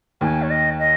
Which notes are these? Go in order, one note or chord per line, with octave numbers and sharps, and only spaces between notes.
D#2 D#3 G#5
C#5
D#5
D#5